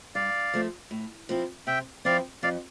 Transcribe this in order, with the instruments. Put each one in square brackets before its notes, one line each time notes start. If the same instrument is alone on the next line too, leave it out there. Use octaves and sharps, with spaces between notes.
[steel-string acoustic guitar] G2 [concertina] D5 F5
[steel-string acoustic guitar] F3 A3 C4
A2
F3 C4 E4
[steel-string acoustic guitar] C3 [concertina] E5 G5
[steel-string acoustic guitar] F3 C4 E4 [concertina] D5 F5
[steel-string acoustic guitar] F2 [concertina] D5 F5